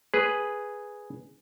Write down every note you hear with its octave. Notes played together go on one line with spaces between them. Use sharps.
G#4 B4